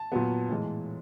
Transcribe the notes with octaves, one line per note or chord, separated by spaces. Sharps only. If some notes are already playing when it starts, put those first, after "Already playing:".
Already playing: A5
A#2 F#3 B3
A2 E3 G#3